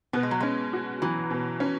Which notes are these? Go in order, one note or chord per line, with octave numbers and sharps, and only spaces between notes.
B2 B3
G#3
F#3
G#3 C#4
F#4
E3 F#3
B2
C#4